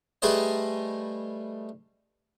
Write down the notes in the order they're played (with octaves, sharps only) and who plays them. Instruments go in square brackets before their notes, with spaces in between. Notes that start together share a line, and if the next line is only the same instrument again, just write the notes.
[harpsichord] G3 A3 G#4 B4 C5 D#5